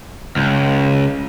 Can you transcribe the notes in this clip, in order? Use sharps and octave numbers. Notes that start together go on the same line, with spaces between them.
C#2